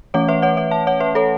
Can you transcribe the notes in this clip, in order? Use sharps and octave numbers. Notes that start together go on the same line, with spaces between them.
E3 A3 C#4 C#5 F#5
B4 E5
C#5 F#5
C#5 F#5
E5 A5
C#5 F#5
B4 E5
A4 C#5